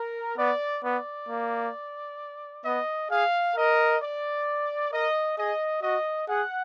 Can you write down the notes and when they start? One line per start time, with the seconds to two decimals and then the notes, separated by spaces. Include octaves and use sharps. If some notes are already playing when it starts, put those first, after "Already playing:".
Already playing: A#4
0.38 B3 D5
0.84 B3 D5
1.29 A#3
2.65 B3 D#5
3.10 G#4 F5
3.56 A#4 D#5
4.01 D5
4.92 A#4 D#5
5.38 G#4 D#5
5.83 F#4 D#5
6.28 G#4 F#5